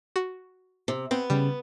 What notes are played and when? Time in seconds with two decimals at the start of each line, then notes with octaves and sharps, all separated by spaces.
0.16 F#4
0.88 C3
1.11 B3 C4
1.30 C#3 G3